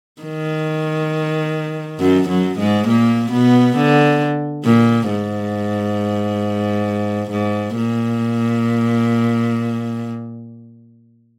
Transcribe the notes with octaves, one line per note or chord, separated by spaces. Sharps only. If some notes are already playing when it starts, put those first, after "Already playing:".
D#3
F#2 F#3
F#2 F#3
G#2 G#3
A#2 A#3
B2 B3
D3
A#2
G#2
G#2
A#2